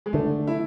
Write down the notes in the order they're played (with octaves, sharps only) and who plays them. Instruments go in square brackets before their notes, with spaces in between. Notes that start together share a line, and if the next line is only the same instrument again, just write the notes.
[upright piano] G#3
[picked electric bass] D3 [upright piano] A3
[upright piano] E4